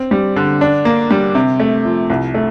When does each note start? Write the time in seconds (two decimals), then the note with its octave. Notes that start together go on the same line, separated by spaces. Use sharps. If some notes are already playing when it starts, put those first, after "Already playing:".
Already playing: C4
0.11 G3
0.36 D3
0.61 D4
0.85 A#3
1.11 G3
1.35 C3
1.60 A3
1.85 F3
2.10 C2
2.34 A3